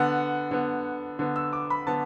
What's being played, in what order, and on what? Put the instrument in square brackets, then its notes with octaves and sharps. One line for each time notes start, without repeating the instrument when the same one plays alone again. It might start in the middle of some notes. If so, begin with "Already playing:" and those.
Already playing: [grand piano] D3 B3 F#5
D3 B3
D3 B3
E6
D6
B5
D3 B3 A5